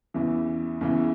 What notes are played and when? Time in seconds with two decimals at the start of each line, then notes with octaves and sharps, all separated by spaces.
0.14 E2 C#3 E3
0.81 E2 C#3 E3